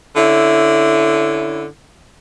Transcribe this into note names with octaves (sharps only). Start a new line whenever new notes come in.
D3 C#4 E4